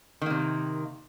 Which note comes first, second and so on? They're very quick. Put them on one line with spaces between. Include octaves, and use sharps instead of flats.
D#3 A#3 C3